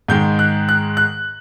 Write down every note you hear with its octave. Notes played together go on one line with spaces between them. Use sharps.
G#2 D#3 G#3 G6
F#6
F#6
F#6